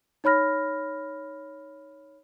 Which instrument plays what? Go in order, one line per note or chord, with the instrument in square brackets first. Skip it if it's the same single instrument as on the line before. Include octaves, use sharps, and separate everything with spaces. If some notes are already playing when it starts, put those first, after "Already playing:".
[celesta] D#4 C#5 B5 F6 A#6